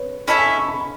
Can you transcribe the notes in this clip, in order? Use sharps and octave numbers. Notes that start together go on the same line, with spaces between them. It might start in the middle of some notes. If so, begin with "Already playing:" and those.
Already playing: B4 C#5
C#4 E4 A4 D#5 E5
G#5
A5
C#6
B5
B5